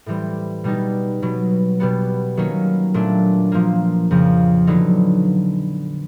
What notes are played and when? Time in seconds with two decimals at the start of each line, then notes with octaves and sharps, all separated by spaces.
0.06 A2 E3 G3 C4
0.64 B2 G3 B3 D#4
1.22 B2 F#3 B3
1.80 B2 G3 B3
2.37 D#3 F#3 A#3 C#4
2.94 A#2 F#3 A3 D4
3.52 A#2 F3 A#3
4.11 F2 C#3 F3
4.67 D3 F#3 B3 D#4